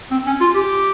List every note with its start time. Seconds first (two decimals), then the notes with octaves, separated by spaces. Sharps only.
0.11 C4
0.26 C#4
0.40 F4
0.55 G4